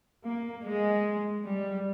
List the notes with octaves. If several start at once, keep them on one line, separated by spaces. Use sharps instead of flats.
A#3
G#3
G3